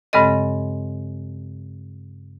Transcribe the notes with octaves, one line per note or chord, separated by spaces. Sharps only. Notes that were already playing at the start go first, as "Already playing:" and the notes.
G2 C#3 G#3 C4 A4 D#5